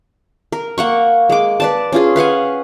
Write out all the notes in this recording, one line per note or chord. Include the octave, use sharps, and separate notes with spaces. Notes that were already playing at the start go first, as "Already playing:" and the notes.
A#4
A#3 F#5 C#6
G#3 D6
B4 D5 A5
C#4 F4 G#4
B4 F5 F#5 G#5